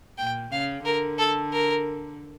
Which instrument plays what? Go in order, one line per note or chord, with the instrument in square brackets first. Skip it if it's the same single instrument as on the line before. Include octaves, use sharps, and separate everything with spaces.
[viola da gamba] A#2 [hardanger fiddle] G5
[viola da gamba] C#3 [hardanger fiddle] F5
[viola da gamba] D3 [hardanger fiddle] A#4
[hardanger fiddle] A4
A#4